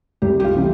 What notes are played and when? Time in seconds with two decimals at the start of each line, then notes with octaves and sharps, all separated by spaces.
0.22 C2 G4
0.40 G4
0.44 F4
0.56 C3 E3 A3 C4